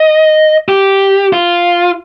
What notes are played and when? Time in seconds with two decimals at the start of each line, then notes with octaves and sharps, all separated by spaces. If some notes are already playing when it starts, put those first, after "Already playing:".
Already playing: D#5
0.68 G4
1.33 F4